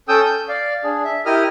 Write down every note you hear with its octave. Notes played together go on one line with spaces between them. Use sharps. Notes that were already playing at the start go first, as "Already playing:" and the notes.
C#4 A4 G5 D#6 E6 G6
G6
D5 F5
D4 G#4
E5
E4 G4 A#4 D#5 D#6 F6